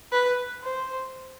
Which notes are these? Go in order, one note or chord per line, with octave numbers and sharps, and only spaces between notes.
B4
C5